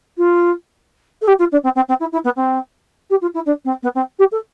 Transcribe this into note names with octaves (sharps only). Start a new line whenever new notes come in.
F4
A4
G4
F4
D4
C4
C4
C4
E4
E4
B3
C4
G4
F4
E4
D4
C4
B3
C4
G4
A4